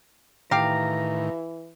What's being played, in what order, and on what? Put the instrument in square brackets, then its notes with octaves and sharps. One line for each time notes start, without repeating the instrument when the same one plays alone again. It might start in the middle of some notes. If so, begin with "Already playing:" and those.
[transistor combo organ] A2 D#3 [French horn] E3 [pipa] G4 F5 [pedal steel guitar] A#5